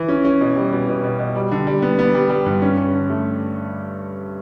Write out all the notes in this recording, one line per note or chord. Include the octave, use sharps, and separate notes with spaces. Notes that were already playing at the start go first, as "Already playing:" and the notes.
Already playing: E3
C#4
C#4
B2
G3
B2
B2
B2
B2
G3
D3
G3
B3
B3
G3
G3
G2
C#4
C#4
D3
A3